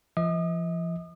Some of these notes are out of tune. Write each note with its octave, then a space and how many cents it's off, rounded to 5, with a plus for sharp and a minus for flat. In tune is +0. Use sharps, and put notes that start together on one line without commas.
F3 -40 D#5 +40 D#6 -40